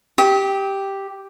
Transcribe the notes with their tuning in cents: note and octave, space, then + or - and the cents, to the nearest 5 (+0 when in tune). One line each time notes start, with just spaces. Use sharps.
G4 +0 D#6 +45